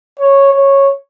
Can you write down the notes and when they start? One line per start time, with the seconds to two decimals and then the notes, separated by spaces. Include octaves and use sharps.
0.19 C#5
0.53 C#5